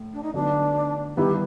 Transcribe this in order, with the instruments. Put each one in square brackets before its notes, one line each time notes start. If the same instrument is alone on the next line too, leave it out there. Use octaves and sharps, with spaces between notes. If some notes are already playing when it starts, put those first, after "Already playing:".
Already playing: [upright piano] A2 A3
[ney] D4
D#4
[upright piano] D3 F#3 B3 D#4 [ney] D4
[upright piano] D#3 G3 B3 E4 [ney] G4